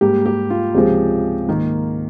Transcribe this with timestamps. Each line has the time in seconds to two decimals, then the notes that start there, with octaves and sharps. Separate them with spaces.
0.01 G#2 G3 A#3 G4
0.26 G4
0.50 F4
0.74 C#2 C3 F3 G#3 G4
1.48 G#2 D#3 A#3